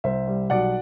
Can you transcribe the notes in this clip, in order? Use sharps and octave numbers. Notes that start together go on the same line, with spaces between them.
C2 C5 E5
G3
B1 D5 F#5